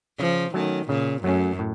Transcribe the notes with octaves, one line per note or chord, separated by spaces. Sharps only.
C#3 F3
D#3 F#3 A3 C#4
A#2 C#3
F#2 F#3 A3 C#4
A2